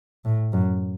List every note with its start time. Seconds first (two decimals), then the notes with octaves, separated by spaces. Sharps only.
0.25 A2
0.53 F#2